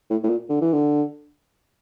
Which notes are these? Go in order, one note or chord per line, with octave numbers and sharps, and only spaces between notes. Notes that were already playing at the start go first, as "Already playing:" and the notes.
A2
A2
A#2
D3
E3
D3